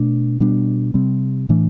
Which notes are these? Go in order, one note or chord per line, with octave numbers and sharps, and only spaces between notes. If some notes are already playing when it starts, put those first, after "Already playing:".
Already playing: B2 A3 D4
B2 G3 B3 D4
C3 G3 C4
A2 E3 A3 D4